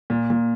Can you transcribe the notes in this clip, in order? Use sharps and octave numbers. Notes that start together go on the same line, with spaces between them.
A#2
A#2